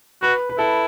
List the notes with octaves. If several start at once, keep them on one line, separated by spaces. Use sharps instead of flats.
F#4 B4
B4
E4 A4